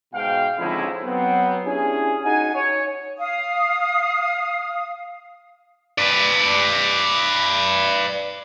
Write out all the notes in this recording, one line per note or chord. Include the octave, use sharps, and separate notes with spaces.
G#2 B2 F5 G5
C#2 D3 F3 C4 D#4 E4
F#3 B3 C4
C#4 D4 E4 G4 G#4
D#4 F#4 G#4 F#5 G#5
C#5
F5 D#6
B4 D5